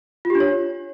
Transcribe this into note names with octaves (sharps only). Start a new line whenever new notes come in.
F4
G4
D4
C#5